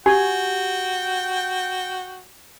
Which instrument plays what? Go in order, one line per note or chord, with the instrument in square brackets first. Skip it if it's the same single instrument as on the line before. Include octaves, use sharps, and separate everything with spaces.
[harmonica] F#4 G5 [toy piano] G4 [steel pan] G#5